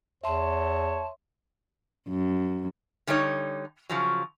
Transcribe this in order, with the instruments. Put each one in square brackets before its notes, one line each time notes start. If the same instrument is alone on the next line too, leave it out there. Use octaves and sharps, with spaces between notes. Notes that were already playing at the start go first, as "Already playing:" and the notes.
[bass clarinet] E2 [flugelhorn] C#5 [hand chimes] E5 C6 [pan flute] A5
[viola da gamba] F#2
[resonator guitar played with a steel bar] D3 G3 D4 D#4 C#5
C#3 F3 F#3